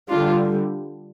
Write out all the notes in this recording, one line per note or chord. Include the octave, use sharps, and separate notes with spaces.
D3 G3 D4 F4